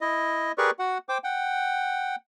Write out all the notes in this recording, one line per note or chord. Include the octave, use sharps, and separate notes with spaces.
E4 D#5
G4 G#4 A#4 B4 D5 C#6
F#4 F#5
C5 G5 D6
F#5 G5